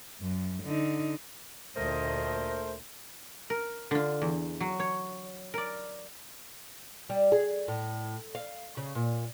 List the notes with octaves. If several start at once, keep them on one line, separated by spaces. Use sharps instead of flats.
F#2
D3 D#4
D2 A#2 A3 A#4 C5 D#5
A#4
D3 F4
E2
F#3
C#5
A#4 D5
G3
G#4
A2
F5
C#3
A#2